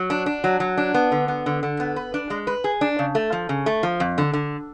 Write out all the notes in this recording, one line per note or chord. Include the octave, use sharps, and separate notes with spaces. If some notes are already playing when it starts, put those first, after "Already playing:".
Already playing: F#3
D4
D4
F#3
F#3
D4
B3
D3
B3
D3
D3
B3
B4
D4
G#3
B4
G#4
D4
C#3
A3
F3
C#3
A3
F3
F2
D3
D3